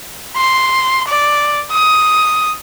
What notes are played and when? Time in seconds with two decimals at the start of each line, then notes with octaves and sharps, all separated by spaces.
0.37 C6
1.08 D5
1.72 D#6